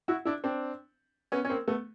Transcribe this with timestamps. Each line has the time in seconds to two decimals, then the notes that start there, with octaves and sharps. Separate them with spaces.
0.08 E4 F#4
0.25 D4 E4
0.44 C4 D4
1.32 B3 C#4
1.45 C#4
1.50 A#3 C4
1.68 A3 B3